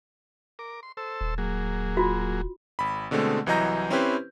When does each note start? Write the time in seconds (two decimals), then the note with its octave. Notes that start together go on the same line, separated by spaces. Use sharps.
0.59 A#4 D6
0.83 C6
0.97 A4 C5 E6
1.21 D#1
1.38 F#3 A#3 G#4
1.97 F4 F#4
2.79 G#1 B5
3.11 B2 D3 G#3 A3 C4
3.46 C2 E3 F#3 D#5 A#5 G6
3.90 C4 C#4 E4 G4 B4 C5